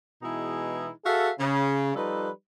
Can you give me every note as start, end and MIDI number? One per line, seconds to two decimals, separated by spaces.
0.22 0.88 47
0.22 0.88 52
0.22 0.88 56
0.22 0.88 63
0.22 0.88 64
0.22 0.88 68
1.05 1.30 66
1.05 1.30 68
1.05 1.30 69
1.05 1.30 76
1.05 1.30 77
1.40 1.92 49
1.95 2.30 53
1.95 2.30 55
1.95 2.30 63
1.95 2.30 69
1.95 2.30 71